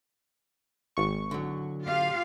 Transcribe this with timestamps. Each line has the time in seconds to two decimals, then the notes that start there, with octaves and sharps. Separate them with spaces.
0.97 G#1 C#6
1.31 D3 F#3
1.85 F4 G4 F5